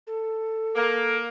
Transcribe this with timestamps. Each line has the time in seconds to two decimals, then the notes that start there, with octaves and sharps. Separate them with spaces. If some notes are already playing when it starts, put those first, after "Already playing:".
0.07 A4
0.76 A#3